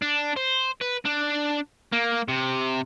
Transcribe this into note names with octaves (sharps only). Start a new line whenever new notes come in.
D4
C5
B4
D4
A#3
C3